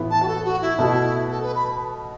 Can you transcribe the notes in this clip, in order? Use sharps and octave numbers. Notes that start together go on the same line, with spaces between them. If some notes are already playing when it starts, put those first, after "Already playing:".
Already playing: A2 E3 B3 E4
A5
F#4
A4
F#4
E4
B2 A3 E4 F#4
A4
B4
B5